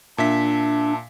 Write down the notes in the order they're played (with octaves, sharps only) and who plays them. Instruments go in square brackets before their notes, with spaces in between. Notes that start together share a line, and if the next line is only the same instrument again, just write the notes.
[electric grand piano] A#2 E5 B6 [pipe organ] D4